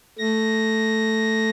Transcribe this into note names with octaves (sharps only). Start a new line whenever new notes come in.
A3 A#6